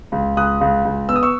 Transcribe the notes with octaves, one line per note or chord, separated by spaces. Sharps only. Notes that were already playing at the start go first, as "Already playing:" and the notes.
C#2
C#2 D#6 F#6
C#2
C#2
B3 E6
D#6
C#6 E6